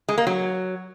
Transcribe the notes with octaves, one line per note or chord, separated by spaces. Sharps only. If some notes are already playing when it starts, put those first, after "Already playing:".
G#3
A#3
F#3